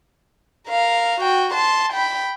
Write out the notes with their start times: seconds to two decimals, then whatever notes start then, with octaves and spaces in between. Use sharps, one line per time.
0.68 A#4 F5
1.20 F#4 G5
1.54 A5 C6
1.92 G5 B5